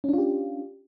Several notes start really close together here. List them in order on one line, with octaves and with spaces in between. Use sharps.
C#4 D4 F4 G4